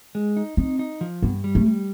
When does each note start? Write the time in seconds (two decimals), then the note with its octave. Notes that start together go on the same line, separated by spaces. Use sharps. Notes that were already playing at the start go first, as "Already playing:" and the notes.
0.15 G#3
0.37 D#4
0.57 C4 D#4
0.79 D#4
1.01 F3
1.22 G2 B3
1.44 G3
1.55 A3
1.66 G3